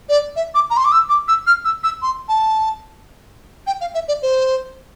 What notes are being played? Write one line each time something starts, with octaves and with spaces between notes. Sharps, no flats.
D5
E5
D6
A#5
C6
D6
E6
D6
E6
F6
E6
E6
C6
A5
G5
F5
E5
D5
C5